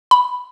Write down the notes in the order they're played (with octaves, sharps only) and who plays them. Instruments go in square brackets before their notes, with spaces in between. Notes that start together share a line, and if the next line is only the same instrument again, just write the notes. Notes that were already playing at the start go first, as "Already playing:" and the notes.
[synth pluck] B5